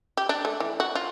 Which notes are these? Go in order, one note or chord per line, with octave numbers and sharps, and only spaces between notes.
G4
D4
A3
E3
F#4
F4